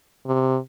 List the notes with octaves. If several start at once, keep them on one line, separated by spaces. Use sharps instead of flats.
C3